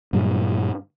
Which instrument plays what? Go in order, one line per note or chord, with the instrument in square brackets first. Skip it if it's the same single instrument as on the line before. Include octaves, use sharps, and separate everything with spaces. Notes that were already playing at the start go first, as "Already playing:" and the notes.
[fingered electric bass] G2 A#2 F#3 G3